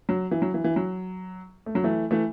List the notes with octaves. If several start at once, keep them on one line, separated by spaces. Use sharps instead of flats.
F#3
E3
F#3
E3
E3
F#3
A3
F#3
E3 A3
E3 A3